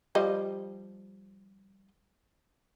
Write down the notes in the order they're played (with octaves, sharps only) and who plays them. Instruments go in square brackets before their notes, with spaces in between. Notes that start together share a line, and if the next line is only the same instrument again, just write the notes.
[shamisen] F3 G3 D#5